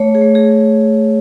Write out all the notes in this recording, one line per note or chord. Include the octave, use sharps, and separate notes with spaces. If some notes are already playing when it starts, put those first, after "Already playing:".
Already playing: A3 C#5
G#4
A3
G#4